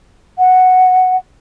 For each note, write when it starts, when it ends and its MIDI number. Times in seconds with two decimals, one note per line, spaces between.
0.38 1.17 78